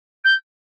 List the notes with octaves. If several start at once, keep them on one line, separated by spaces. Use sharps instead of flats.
G6